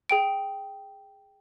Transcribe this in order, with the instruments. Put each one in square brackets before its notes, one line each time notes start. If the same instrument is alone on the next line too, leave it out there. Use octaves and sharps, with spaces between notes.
[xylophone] G#4 G5 D7